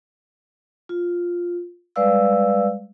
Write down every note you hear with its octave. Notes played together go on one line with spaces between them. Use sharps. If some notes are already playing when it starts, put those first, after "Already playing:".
F4
G3 G#3 B4 D5 F5 E6